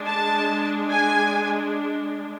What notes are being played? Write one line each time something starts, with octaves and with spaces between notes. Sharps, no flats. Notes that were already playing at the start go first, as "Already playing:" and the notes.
Already playing: G#3 D4
A5
G#5